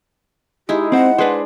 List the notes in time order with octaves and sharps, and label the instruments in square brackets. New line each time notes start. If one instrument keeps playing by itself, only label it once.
[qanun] G#3 D#4 E4 [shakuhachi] G4
[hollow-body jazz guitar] C4 C5 [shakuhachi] F#5
[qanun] G#3 D4 [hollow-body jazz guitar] B4 C5